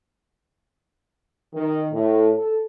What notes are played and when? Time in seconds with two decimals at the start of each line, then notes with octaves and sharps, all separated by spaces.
1.54 D#3
1.91 A2
2.35 A4